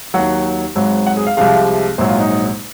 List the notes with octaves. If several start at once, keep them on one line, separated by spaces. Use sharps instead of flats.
D#2 D#3 F#3 F#5
G#1 G#2 F#3
F#5
G#4
F5
C2 C3 F3 G#3 F5
A#1 G#2 F#3 C5
F4
D#4